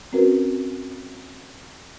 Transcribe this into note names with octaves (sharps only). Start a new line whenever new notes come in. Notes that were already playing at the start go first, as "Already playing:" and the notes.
C4 C#4 F#4 A#4 B4